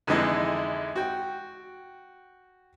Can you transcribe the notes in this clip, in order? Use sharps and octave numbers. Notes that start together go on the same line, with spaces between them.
F2 D3 E3 G#3 D#4 E4
F#4 G5